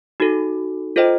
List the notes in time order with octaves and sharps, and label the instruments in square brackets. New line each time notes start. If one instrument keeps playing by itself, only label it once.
[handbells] D#4 F#4 A4
F4 A4 C5 D#5 G5